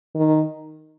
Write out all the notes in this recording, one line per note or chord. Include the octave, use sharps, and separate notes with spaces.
D#3